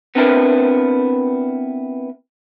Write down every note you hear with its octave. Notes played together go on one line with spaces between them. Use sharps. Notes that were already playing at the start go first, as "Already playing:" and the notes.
B3 C4 D4 E4 A#4 B4